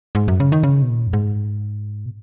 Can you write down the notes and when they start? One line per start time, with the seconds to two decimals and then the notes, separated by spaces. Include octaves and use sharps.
0.15 G#2
0.28 F#2
0.40 C#3
0.52 D#3
0.63 C#3
0.82 B2
0.89 A#2
1.07 F#2
1.13 G#2
2.06 B2